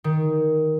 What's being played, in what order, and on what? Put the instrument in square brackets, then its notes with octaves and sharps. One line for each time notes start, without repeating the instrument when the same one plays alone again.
[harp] D#3